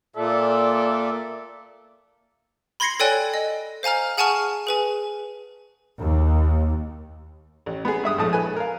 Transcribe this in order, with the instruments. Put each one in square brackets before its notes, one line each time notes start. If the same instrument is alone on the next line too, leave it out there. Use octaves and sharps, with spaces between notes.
[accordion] A#2 [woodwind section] A4 D5 E5
[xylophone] B5 C6 G#6 A#6 C7 C#7
A4 C#5 D5 G5 G#5 F#6
D#5
C5 F5 G#5 A#5 F6
G#4 F#5 G#5 A5 C#6 F6
G#4 B4 G#5
[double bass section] D#2
[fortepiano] A1
B3 G#4
G2 E5 D#6
A#1 A2 G#3 A3 A5 D#6
B4 G#5
A#4 F5